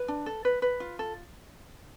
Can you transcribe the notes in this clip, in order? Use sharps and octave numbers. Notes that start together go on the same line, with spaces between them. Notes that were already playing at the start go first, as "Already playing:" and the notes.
Already playing: B4
D4
A4
B4
B4
F4
A4